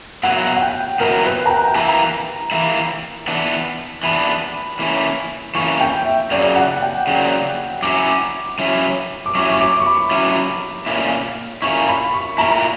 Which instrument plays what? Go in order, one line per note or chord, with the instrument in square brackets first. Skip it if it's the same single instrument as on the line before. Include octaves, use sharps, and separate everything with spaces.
[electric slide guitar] B2 F#3 A#3 E4 [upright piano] F#5
[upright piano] F#5
G5
[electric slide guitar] B2 F#3 A#3 E4 [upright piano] A#4
[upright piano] B4
A#5
G5
G5
[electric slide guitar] E3 A#3 E4 [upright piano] A#5
[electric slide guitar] E3 A#3 E4
E3 B3 D4
[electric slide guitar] E3 B3 D4 [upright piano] B5
[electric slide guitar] E3 A#3 C#4 E4
[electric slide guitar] E3 A#3 C#4 E4 [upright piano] C#6
[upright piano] G5
E5
[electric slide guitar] C#3 F#3 A#3 [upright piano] D5
[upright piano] F#5
G5
[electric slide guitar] C#3 F#3 A#3
[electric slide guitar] F#3 C#4 E4 [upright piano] D6
[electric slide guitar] F#3 C#4 E4
[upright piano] D6
[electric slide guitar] F#3 C#4 E4 [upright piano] C#6
[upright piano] C#6
D6
C#6
B5
[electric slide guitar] F#3 C#4 E4
A#2 A#3 C#4 E4
[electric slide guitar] A#2 A#3 C#4 E4 [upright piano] C#6
[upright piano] B5
C#6
[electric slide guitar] A#2 A#3 E4 [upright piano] A#5